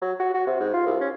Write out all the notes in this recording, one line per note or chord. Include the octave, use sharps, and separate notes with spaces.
F#3
F#4
F#4
C3
G#2
F4
C2
C#4